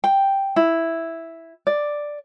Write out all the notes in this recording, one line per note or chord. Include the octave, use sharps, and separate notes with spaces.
G5
E4
D5